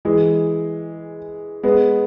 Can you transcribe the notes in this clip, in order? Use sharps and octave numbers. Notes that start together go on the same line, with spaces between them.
E3 G#3
G#3 B3